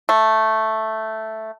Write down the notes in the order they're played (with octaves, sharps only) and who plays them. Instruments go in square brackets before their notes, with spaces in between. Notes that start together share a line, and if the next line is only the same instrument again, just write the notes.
[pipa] A3